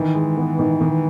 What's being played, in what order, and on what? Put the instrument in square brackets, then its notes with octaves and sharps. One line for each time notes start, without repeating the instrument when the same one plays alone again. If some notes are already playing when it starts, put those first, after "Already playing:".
Already playing: [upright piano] D#3 [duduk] E3
[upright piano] G#3
B3
D#3
D#3